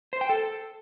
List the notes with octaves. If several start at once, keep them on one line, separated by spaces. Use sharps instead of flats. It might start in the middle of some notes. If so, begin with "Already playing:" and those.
C5
G5
A4